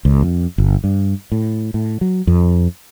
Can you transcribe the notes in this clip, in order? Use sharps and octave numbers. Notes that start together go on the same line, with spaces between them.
C#2
F2
G1
G2
A2
A2
F#3
F2